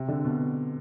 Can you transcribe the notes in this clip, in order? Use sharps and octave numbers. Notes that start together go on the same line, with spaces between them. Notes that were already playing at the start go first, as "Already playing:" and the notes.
Already playing: C3
D3
B2